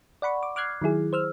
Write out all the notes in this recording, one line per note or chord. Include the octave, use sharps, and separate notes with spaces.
D5 F#5 B5 C#6
D6
D6 F6 F#6 G#6 C7
D#3 F#3 E4 G#4
C5 E6 F6